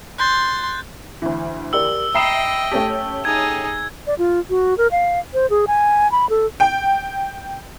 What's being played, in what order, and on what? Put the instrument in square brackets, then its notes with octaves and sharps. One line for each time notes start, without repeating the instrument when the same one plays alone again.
[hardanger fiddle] C6 [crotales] F#6 G6 A6
[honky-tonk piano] D2 E3
[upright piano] G4 A#4 D5 [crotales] E6 G7
[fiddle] D#5 G5 [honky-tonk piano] E5 C7 E7 [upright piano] A#5 B5 D#6
[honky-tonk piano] A3 C#4 G4 [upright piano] A5
[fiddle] D#4 G#4 [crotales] G#6
[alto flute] D5
F4
F#4
A#4
F5
C5
G#4
G#5
B5
A4
[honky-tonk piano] G5